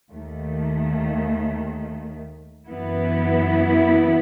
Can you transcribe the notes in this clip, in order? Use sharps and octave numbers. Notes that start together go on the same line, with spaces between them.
D#2 D#3 A3
F#2 E3 B3 E4